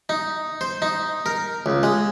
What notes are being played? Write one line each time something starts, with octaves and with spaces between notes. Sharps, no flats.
D#4
C5
D#4
A#4
C#2
G#3